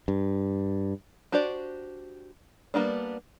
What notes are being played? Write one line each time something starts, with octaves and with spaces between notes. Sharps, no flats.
G2
D4 F#4 G4 C5 D5
G3 A#3 B3 D4